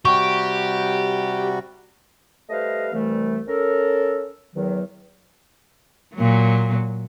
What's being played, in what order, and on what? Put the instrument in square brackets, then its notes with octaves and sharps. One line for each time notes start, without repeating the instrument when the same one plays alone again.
[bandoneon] C3 G3 F#4 [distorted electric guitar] G4 [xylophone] C#6
[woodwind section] G3 A3 B4 C5 D#5 F5
C2 C3 E3 G3 A3
C#4 A4 A#4
E2 D#3 F#3
[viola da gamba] A#2 F#3